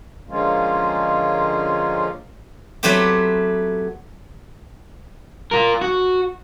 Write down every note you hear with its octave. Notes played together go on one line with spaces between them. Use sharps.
D3 F3 G#3 A#3 C#4 F4
F#3 A3 B3 C4 G4
F4 A#4
F#4